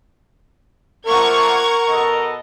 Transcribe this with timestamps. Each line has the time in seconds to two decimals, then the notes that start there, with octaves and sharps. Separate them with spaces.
1.07 F3 A3 A#3 A#4 F#5 C#6 G#6
1.89 B2 A4 D#5